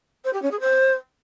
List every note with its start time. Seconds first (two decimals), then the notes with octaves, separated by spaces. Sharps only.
0.24 C5
0.33 G4
0.42 C#4
0.51 G#4
0.60 C5